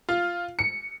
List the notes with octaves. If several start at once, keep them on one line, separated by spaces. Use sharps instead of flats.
F4
C#7